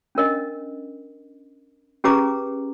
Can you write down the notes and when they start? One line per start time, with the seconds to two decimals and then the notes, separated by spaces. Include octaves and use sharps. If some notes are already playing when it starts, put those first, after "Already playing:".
0.15 C#4 D4 A#4 D#5
2.04 C#4 G4 G#4 B4 A#5 D6